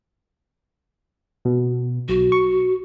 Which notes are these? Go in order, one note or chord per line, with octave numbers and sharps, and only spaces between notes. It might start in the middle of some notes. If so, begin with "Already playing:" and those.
B2
B1 F#4
C#6